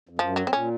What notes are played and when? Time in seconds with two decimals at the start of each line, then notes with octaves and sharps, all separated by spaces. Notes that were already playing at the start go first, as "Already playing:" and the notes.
0.09 F2
0.19 F#2 F3
0.36 F#3
0.47 C4
0.53 A#2 C#4